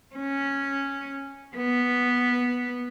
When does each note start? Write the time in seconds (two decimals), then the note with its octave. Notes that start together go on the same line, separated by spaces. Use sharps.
0.16 C#4
1.57 B3